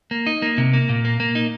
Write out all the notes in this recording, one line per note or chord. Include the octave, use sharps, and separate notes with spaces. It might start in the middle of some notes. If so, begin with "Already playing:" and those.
A#3
D#4
A#3
C3
A#3
A#2
A#3
A#3
D#4